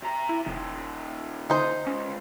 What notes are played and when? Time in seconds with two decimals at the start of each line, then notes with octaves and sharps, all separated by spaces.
0.02 C3 A#5
0.29 E4
0.46 F1 A#2 D#3
1.50 D3 D#4 C5
1.87 C#2 C#4